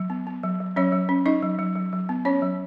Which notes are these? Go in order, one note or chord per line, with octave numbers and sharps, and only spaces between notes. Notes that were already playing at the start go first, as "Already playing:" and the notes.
Already playing: F#3
B3
B3
F#3
F#3
F#3 C#4 C#5
F#3
C#4
C#4 D#4 D#5
F#3
F#3
F#3
F#3
B3
B3 C#4 C#5
F#3